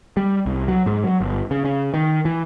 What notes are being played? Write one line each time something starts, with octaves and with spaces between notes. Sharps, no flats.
G3
C2
F#3
G#2
F#3
G1
C#3
C#3
D#3
E3